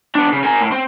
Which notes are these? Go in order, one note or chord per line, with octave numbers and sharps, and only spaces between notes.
B3 D4
C#3
A#4 G#5
A2
C4